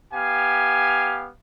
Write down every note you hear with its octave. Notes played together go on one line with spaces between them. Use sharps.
B3 G4 F5 G#5